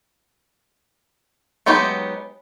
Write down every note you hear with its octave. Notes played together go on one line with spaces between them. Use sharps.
F#3 G#3 B3 D#4 G4